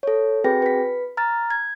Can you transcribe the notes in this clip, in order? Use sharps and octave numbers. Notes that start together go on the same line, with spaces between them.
A4 C#5
C4 F#4 G#4 B4 G5 A#6
B4 B6
A#5 F6 A6
G#6